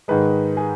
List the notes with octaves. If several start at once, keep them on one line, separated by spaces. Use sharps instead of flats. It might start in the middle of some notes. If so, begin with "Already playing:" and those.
G#2 D#3 G#3 B4
G#4